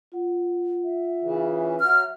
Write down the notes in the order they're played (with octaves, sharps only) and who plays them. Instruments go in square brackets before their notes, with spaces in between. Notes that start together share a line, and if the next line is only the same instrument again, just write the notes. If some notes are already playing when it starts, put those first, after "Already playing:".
[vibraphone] F4 F#5
[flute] E5
[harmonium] C#3 E3
[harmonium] F#3 [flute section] F6